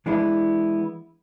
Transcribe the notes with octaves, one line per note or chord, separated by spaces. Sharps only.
E3 G#3 B3 D4 E4